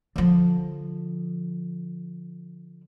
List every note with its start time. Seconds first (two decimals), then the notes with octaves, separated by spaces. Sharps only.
0.16 D3 F3